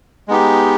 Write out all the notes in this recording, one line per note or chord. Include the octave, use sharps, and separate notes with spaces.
G#3 B3 D#4 G4